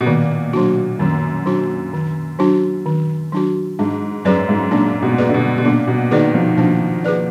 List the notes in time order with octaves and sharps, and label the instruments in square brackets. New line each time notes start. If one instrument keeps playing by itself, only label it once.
[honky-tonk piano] B2
[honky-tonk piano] A#2 [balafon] D#3
[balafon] F#3 D4 F#4
[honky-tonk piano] F#2 [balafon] D#3
[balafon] F#3 D4 F#4
D#3
F#3 D4 F#4
D#3
F#3 D4 F#4
[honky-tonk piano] G#2 [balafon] D4
[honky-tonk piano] F#2 [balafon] G#4 B4 D5
[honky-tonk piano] G#2
[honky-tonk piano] A#2 [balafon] D4
[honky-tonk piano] B2
[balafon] G#4 B4 D5
[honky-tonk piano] D3
B2
B2
[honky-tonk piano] A#2 [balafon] D4
[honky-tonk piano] B2
[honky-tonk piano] D#3 [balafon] G#4 B4 D5
[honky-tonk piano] F3
[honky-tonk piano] F3 [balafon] D4
[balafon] G#4 B4 D5